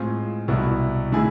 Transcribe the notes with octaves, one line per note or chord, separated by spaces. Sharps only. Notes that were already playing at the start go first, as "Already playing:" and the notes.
Already playing: A2 G#3 C4 F4
C2 B2 B3 E4
D3 A3 E4 G#4